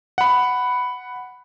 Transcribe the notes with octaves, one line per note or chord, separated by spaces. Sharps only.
F#5 B5